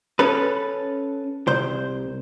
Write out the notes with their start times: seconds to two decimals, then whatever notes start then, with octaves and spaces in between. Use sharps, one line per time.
0.19 C#4 A4 B4
1.47 C2 C5